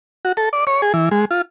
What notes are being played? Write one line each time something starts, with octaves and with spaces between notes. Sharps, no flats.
F#4
A4
D5
C#5
G#4
E3
G#3
F4